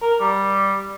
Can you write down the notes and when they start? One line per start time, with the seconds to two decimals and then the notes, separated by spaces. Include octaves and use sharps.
0.02 A#4
0.20 G3